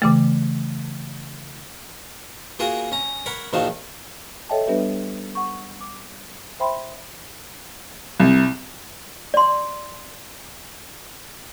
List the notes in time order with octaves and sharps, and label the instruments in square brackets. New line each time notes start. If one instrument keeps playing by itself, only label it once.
[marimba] C#3 E3 A3
[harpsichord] A#3 F4 F#4 G#4 A#4
C#4 A#5
A#4 C#5 F#5 B5
A#1 D#3 F3 F#4 F5 A5
[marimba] A4 C#5 D#5 E5 G5 A5
G3 B3 D4 G4 B4 E5
F#5 C#6
D6
C5 E5 G5 B5 C6
[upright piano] C2
[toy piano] D5 C6